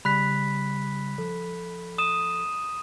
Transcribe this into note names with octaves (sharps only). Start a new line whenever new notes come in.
C#3 G3 B5 F#6 B6
F3 A4
D#6 D#7 E7